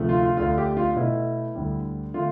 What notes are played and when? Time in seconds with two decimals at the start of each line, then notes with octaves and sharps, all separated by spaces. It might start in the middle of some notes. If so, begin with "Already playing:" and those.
Already playing: D2 C3 F3 A3
0.09 F4
0.23 F4
0.37 D2 D3 A3 F4
0.58 G4
0.77 F4
0.96 B2 A3 E4
1.55 D2 D3 G3
2.14 D3 A3 F4